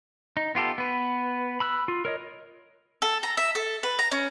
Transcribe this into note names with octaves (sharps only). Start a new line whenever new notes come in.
D#4
B3 F4 G4 A4
B3 B4
B5 E6 F#6
F4
A#4 C#5 D#5
A4
A#5
E5
A4
B4
A#5
C#4